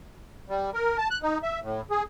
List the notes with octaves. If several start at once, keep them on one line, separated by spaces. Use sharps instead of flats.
G3
A#4
A5
F#6
D#4
E5
A2
G#4